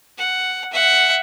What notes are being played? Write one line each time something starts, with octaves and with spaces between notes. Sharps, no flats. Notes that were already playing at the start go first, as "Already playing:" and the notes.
F#5
E5 F#5